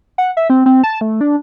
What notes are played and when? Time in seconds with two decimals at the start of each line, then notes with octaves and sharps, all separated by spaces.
0.18 F#5
0.37 E5
0.50 C4
0.66 C4
0.84 A5
1.01 A3
1.21 D4